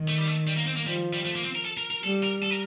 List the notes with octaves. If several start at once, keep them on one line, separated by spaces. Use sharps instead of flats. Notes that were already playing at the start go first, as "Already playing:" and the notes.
Already playing: D#3
A3
G3
A3
G3
A#3
C4
A#3
F3 G3
G3
A3
A#3
C4
A#4
A4
A#4
A#4
G3 A4
A#4
A4
A#4